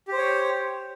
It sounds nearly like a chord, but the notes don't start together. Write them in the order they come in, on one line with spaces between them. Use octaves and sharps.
G4 C5 C#5